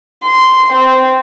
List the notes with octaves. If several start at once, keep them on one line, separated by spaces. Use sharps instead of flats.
C6
C4